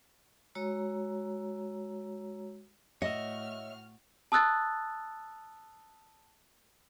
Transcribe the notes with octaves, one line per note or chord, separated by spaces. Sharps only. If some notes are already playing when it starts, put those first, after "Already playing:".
G#3 F#4 C#5 A#5 E6
A2 F#4 C#5 D#5 E5 F6
A5 D#6 E6 F#6 A6